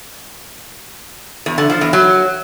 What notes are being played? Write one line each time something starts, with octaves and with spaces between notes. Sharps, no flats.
E2
D3
F3
E2
F#3